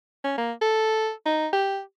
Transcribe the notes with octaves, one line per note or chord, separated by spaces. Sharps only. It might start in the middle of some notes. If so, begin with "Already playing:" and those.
C#4
A#3
A4
D#4
G4